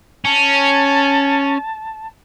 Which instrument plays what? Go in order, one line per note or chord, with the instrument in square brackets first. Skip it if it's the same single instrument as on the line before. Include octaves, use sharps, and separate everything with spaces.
[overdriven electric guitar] C#4 [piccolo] A5